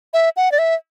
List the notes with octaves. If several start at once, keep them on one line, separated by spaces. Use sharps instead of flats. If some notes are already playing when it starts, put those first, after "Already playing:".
E5
F#5
D5
E5